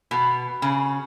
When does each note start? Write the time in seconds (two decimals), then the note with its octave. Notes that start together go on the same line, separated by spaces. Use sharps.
0.11 B2
0.62 C#3